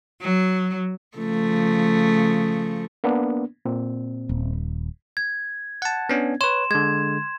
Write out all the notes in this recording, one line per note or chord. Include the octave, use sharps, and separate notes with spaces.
F#3
C#3 F3 A3
A#3 B3 D4
A#2 C4
D#1
G#6
F#5 A5
B3 C#4 D4
B4 C#5 C6 E7
D3 G#3 G#6